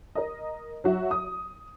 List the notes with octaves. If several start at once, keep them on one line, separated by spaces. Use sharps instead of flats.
A#4 D#5
F#3 F#4 E5
D#6